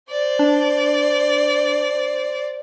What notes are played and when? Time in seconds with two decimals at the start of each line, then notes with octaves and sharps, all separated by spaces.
0.10 C5 D5
0.39 D4